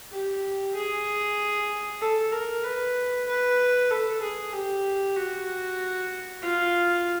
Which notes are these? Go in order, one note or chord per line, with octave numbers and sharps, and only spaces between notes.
G4
G#4
A4
A#4
B4
B4
A4
G#4
G4
F#4
F4